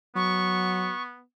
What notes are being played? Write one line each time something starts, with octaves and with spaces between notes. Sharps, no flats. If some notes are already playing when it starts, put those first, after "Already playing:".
F#3 B3 C#6